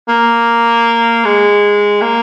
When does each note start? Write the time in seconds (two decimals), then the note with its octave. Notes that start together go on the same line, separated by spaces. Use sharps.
0.09 A#3
1.25 G#3
2.02 A#3